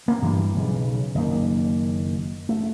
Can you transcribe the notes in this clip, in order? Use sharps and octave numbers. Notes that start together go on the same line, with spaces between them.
A#3 C4
G2 E3 G3 D4
B1 C#3
F#1 D#3 A#3
A3